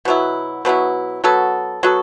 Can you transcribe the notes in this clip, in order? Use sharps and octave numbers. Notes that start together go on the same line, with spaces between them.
B2 F#3 B3 E4
B2 F#3 B3 E4
F#3 B3 F#4 A4
F#3 B3 F#4 A4